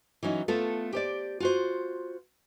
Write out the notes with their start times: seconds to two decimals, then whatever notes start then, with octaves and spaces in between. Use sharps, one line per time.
0.23 E3 F#3 C#4 D#4
0.48 A3 B3 F4 A4
0.93 G4 C5 D5
1.40 F4 F#4 C5